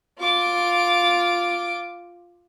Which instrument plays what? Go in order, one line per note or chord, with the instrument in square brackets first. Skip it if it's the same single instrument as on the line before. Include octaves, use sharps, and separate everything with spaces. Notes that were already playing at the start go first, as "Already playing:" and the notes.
[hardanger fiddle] F4 D6